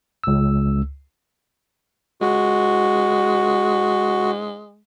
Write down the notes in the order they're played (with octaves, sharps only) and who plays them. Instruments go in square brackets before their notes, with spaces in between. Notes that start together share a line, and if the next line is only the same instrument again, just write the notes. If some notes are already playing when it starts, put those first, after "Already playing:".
[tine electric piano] C#2 E6
[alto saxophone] G#3 [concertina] F#4